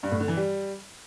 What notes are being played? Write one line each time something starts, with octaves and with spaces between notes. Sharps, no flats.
G2
A2
D3
E3
G3